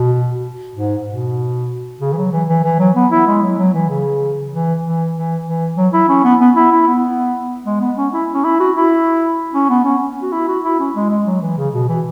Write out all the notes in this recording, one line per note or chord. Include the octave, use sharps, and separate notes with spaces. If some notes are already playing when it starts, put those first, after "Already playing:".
Already playing: B2
G#2
B2
C#3
E3
F#3
E3
E3
E3
F#3
B3
E4
G#3
F#3
F#3
E3
C#3
E3
E3
E3
E3
F#3
E4
C#4
B3
B3
E4
E4
B3
G#3
B3
C#4
E4
C#4
E4
F#4
E4
C#4
B3
C#4
F#4
E4
F#4
E4
C#4
G#3
G#3
F#3
E3
C#3
B2
E3